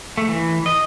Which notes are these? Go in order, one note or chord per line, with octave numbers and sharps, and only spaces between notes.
A3
E3
D#5